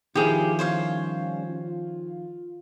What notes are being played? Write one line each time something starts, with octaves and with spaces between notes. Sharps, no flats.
B2 D#3 F3 G#3 E4 G4 G#4
G3 C#4 C5 C#5 F5
F4